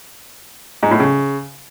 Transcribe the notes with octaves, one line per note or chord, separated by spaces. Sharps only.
G#2
A2
C#3